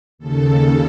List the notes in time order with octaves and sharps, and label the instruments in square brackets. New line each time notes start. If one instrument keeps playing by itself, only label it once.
[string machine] D#2 C#3 A4